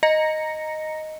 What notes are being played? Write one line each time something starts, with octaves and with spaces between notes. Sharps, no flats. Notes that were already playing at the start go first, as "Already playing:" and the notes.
D#5 A#5 A#6 C#7